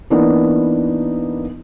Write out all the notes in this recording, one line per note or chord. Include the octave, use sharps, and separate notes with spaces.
E3 A#3 B3 D4 D#4